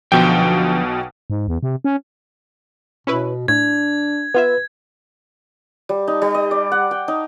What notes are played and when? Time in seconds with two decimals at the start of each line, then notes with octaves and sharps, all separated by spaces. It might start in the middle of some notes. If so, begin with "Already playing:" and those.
0.12 B1 B2 D3 F3 G4 G5
1.30 G#2
1.48 E2
1.63 C3
1.85 C#4
3.07 B2 C#4 E4 B4
3.48 A2 D4 G#6
4.34 B3 F4 B4 E5
5.89 G3
6.08 D#4
6.22 G3
6.34 D#5
6.51 D5
6.72 F#5
6.91 G5
7.08 D#4